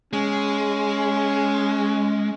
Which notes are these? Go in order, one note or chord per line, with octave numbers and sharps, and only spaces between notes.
G#3 C#4